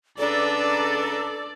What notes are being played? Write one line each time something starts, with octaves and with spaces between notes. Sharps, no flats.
C#2 D4 A4 B4 D5 A#5 D6